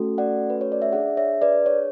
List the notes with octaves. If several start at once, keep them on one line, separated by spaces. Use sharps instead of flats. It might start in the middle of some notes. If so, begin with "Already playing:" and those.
Already playing: A3 C#4 F#4 A4
D5 F#5
B4
C#5
D5
E5
D4 G#4 D5 F#5
C#5 E5
B4 D5
C#5